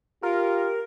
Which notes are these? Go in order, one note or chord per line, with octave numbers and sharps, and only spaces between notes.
F4 G4 A#4